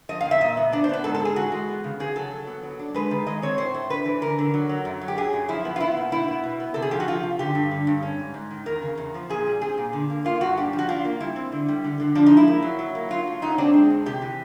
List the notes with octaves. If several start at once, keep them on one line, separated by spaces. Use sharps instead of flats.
F3 D#5
F5
E2
E5
A#2 D#5
B3
D4 D5
C5
B3 B4
G#2 A4
A4
G#3
G#4
E3 F#4
G#3
B3
C#3
C#3 G#4
F#3 A4
F#3
B3
F#3
D4
G#3 B4
D#3
G#3 D#5
C4 C#5
A2 C5
A3
D4 B4
E3
D3 A#4
D3
F#3
F#3
F#2
F#3
G4
F#3 G#4
F#2
F3 E4
B3
F4
B3 E4
A#2
B2 E4
B3
B2
B3
C3 A4
G#4
F3 G4
F#4
F3 F4
C3
D3 G4
G2
D3
G2
C#4
G#2
G#2
D#3
E2 A#4
C#3
E2
F3
A#2 G#4
G3
C4 G#4
A#2
D3
A#3
A#3 F4
G2 F#4
D4 G4
F3
F#4
D4 F4
A#3
G3 E4
C4
D3
G3
D3
D3
F3 D4
D#4
G#3
E4
A#3
F#3
F#3
A#3
F#3 F4
A3
F#3 D#4
C4 D4
G#3
E2
C3 G4
E3